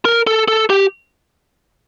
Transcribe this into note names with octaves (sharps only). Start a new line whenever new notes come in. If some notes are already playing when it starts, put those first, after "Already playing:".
A#4
A4
A4
G4